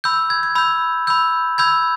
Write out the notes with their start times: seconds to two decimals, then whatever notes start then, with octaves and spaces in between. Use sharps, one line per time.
0.04 B5 E6 G6
0.30 G#6
0.43 G#6
0.55 B5 E6 G6
1.07 B5 E6 G6
1.58 B5 E6 G6 G#6